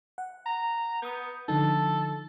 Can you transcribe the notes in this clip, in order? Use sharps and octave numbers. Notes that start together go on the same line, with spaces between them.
F#5
A#5
B3 D#6 G6
D3 F3 D#4 A4